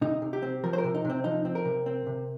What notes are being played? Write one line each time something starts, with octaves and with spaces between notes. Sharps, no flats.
C3 D#4
C3
G4
C4
F3 A#4
C5
A#4
C3
D#4
C3 C4
F3 D#4
C4
A#4
C3
C4
C3